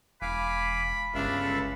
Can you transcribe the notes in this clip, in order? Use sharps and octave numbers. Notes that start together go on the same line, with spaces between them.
E1 F5 G#5 B5 D6
G1 C#2 D4 E5 F5 B5
A4